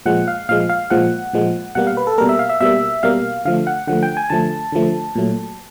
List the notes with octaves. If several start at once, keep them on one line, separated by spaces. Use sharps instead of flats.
A#2 F3 G#3 F#5
F5
A#2 F3 G#3 F5
F5
A#2 F3 G#3 F#5
A#2 F3 G#3
B2 G3 A#3 F#5
F5
B4
A4
B2 G3 A#3 A#4
E5
F5
E5
B2 G3 A#3 E5
B2 G3 A#3 F5
D3 F3 A3 F5
F#5
D3 F3 A3 F#5
G5
G#5
D3 F3 A3 A5
D3 F3 A3
A#2 F#3 A3